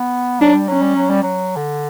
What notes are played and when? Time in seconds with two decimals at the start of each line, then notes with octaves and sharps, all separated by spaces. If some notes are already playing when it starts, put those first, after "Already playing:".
Already playing: B3
0.41 F#3 D4
0.55 G3
0.69 F#3 C#4
0.82 G3
0.96 F#3
1.10 G3
1.23 F#3
1.57 D3